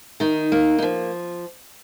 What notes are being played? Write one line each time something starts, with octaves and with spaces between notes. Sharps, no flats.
D#3 D#4
A#3
D#4
F3